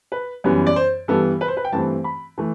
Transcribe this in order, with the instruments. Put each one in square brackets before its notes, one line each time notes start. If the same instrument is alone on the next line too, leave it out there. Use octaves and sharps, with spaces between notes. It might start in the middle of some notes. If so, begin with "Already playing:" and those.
[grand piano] B4
F#2 E3 G3 B3
D5
C5
G2 E3 G3 B3 A4
B4
C5
B4
G5
G2 E3 A3 C4 A5
B5
E3 A3